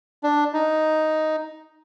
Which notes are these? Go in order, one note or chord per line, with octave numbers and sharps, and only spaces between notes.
D4
D#4